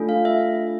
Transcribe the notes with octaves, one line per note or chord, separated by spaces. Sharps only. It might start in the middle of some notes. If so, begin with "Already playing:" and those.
Already playing: A3 D4 F4 A4
F5
E5